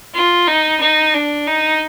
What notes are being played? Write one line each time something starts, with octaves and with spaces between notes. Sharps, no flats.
F4
D#4
D#4
D4
D#4